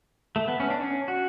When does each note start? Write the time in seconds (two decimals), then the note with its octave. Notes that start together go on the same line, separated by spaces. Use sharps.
0.36 A3
0.48 B3
0.60 C#4
0.70 D4
0.81 C#4
1.08 F#4